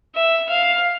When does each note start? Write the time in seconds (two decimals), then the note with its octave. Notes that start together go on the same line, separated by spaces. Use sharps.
0.15 E5
0.49 F5